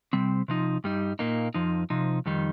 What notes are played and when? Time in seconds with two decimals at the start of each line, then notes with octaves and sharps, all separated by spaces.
0.13 C3 G3 C4
0.48 C3 F3 D#4
0.84 G2 G3 D#4
1.19 A#2 A#3 D#4
1.54 F2 F3 D#4
1.90 C3 F3 D#4
2.26 F2 D#3 G3 D#4